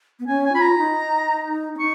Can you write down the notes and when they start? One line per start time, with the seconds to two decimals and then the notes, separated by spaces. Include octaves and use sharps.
0.20 B3
0.27 C#4 G#5
0.45 G#5
0.53 F4 B5
0.61 A#5
0.78 D#4
1.75 C#4
1.79 D#4 C#6